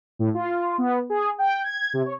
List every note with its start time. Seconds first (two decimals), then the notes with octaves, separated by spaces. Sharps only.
0.19 A2
0.34 F4
0.78 B3
1.10 G#4
1.39 G5
1.64 G#6
1.93 C3
2.06 C#5